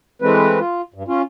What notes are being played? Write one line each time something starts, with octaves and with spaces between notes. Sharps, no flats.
E3 G#3 A3 C4 B4
F4
G2
C#4 F4